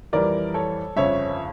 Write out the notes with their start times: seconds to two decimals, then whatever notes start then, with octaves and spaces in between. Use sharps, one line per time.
0.13 F2 E3 G3 A#4 D5
0.54 A4 C#5
0.96 G1 F2 C#3 C#5 E5